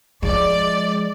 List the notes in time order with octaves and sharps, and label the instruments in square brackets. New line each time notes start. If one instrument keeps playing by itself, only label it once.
[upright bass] F3 [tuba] G#3 [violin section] D5